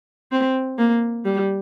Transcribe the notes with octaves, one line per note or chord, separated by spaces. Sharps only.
C4
A#3
G3